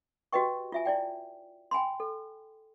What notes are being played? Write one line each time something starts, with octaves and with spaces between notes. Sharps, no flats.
F#4 G4 B4 D#5 G5 C#6
F4 E5 G#5
E4 D5 G5
G5 G#5 B5 C6
A4